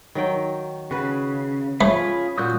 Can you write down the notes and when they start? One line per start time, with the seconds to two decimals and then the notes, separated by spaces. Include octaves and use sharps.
0.15 D#3 F#3 G5
0.91 C#3 F#4 B4
1.81 A3 C#4 F4 G#4 B5
2.38 A#2 F#4 D#6 G6